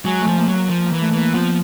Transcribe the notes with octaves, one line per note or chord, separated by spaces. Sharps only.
F#3 G#3
A3
F3
A#3
F#3
A#3
F3
A#3
E3
A3
E3
A#3
F3 B3